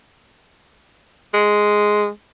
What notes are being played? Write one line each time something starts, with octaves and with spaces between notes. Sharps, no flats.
G#3